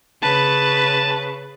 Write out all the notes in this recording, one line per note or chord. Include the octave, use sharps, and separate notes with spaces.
C#3 B4 A5